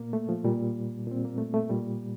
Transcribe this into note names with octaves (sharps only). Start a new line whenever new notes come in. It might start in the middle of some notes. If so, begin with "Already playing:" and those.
Already playing: A#2 A#3
A3
F3
A#2 G3
A#2 C4
A#3
A3
A3
A#2 G3